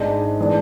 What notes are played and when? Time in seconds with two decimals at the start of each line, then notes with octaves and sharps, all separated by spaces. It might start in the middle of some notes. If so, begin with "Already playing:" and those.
Already playing: G#1 G#2 G#3 D4
0.41 E3 G#3 D4